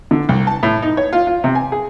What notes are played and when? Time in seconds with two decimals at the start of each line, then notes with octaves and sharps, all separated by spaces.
0.11 D3
0.29 C2
0.47 A5
0.63 A2
0.82 D#4
0.97 C#5
1.13 F4
1.27 F4
1.44 C3
1.55 G#5
1.72 G#4